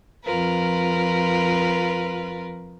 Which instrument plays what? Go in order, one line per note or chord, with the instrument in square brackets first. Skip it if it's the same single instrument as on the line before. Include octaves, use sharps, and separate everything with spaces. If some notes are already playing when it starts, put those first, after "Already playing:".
[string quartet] F2 F4 A#4 B4